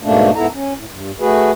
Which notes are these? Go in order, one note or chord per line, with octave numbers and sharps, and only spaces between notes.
G#2 B2 A3 A#3 D4
G#2 B3 E4 A4 A#5
C#4
A2
G2
A3 F#4 G#4 B4